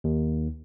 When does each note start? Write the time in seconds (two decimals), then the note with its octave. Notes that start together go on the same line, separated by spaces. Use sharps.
0.04 D#2